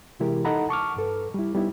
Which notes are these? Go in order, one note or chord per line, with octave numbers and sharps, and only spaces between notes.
C3 E3 G#3 E4 G4 A#4
D#4 A4 D#5 F#5 A#5 B5
A5 C#6 D6 F6
G2 A4 B4
G3 E4
G3 B3 D#4 E4